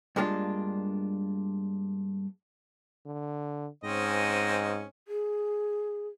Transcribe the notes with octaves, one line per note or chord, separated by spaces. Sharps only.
G2 G#3 A#3 D4 F4
D3
G#2 C4 C#4 D#5
G#4